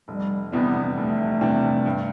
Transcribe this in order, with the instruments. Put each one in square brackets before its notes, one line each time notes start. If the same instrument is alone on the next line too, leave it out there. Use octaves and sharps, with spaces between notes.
[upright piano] F1 [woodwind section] G3
[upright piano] E2 C3 G3 D4 [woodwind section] B3
[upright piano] F1 [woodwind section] A3
[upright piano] E2 C3 G3 D4
G2